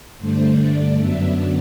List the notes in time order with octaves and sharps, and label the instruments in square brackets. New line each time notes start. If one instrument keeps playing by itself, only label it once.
[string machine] G2 D3 A3 D4 C5
D5
F#2 D3 F#3 B3 D4 E5